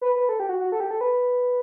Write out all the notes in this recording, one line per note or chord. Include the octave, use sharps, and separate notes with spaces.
B4
B4
A4
G4
F#4
F#4
A4
G4
A4
B4